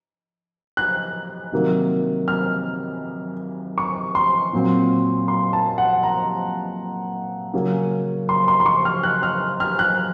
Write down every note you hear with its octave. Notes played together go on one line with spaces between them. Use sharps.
F#6
C3 D#3 F#3 A#3
F6
C#6
C6
A#2 F#3 C4
C6
A5
F#5
A#5
C#3 F#3 A#3 C#4
C6
C6
C6
C#6
F6
F#6
F6
F6
F#6